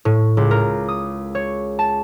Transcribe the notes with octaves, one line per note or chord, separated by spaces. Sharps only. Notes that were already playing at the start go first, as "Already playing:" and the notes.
A2
C#2
A#4
D#6
C#5
A5